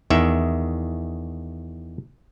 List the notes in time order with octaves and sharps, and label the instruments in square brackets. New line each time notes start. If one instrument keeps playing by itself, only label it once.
[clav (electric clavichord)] E2 D#3 E5